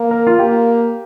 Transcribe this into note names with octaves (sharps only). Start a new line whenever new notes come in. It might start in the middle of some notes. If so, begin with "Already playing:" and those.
Already playing: A#3
A#4
F4
A#3 G4